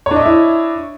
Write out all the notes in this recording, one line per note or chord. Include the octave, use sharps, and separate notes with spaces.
D4 E4 C#5 D#5 E5